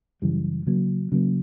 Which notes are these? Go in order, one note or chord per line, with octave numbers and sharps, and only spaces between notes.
F#2 C#3 E3 G3
C#3 F#3 A#3
C#3 F#3 A#3